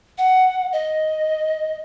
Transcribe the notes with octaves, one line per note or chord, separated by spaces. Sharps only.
F#5
D#5